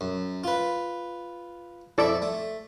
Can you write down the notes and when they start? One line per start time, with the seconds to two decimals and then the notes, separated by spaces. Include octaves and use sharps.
0.01 F#2
0.44 F4 B4
1.98 F2 E4 A4 D5 E5
2.22 A3